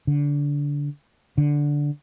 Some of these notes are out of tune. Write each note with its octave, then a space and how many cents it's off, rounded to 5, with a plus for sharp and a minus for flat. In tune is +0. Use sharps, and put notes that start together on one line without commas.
D3 -20
D3 -5